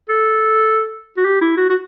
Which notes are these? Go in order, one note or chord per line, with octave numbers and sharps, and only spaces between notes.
A4
F#4
G4
E4
F#4
F#4